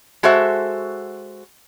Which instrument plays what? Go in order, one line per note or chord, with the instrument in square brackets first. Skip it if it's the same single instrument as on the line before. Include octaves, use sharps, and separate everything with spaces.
[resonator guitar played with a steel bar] G#3 F#4 A4 C5 E5